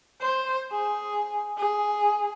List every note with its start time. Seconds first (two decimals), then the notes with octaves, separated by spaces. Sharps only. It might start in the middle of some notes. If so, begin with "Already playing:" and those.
0.21 C5
0.72 G#4
1.57 G#4